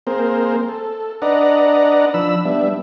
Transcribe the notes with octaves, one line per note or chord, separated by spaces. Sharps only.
A#3 C4 G#4 A#4 C5
A4
D4 B4 D5 D#5 F#5 A#5
F3 D4 B5 E6
G3 B3 D4 E5